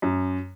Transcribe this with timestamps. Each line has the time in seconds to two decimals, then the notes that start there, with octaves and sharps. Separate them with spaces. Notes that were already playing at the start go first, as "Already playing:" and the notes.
0.02 F#2